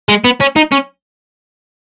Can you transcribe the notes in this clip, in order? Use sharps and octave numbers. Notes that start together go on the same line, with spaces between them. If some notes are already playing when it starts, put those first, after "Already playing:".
G#3
B3
C#4
D#4
C#4